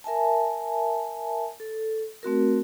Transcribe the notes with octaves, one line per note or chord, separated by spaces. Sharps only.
A#4 E5 G#5 A5
A4
A3 C4 F#4 A#4